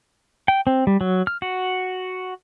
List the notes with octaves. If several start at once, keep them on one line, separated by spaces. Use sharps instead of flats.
G5
C4
G3
F#3
F6
F#4